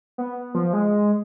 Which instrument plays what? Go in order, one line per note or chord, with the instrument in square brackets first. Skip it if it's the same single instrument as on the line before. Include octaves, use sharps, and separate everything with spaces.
[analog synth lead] B3
F3
G#3